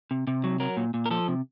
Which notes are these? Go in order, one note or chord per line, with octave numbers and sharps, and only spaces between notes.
C3
C3
F#3
F#3 A#4
A#2
A#2
A#4
F3 A4
C3